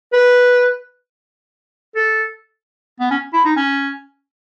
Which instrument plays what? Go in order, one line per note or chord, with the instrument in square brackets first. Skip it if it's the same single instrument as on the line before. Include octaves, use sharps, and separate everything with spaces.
[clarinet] B4
A4
B3
C#4
E4
D#4
C#4